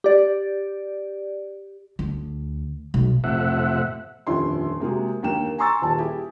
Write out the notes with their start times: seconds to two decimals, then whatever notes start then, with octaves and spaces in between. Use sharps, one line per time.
0.04 G4 D5
1.99 D2
2.94 B1
3.24 F2 A2 C3 E5 F#5
4.27 D#1 F2 D3 C#4 E4 C6
4.80 C3 G#3 A#3 F#4 G#4
5.23 D#2 D3 A#3 G5 E7
5.58 G#5 A#5 C6 C#6 E6 A6
5.82 D#1 A5
5.98 E4 G4 G#4